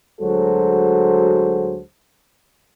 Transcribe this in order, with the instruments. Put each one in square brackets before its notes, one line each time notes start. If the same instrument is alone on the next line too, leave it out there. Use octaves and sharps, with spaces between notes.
[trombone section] D2 F#3 G#3 F#4 A4 C5